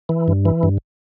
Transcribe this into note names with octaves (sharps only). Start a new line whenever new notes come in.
E3
G2
E3
G2